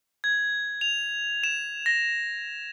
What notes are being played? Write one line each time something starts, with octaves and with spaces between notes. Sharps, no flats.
G#6
F7
E7
A#6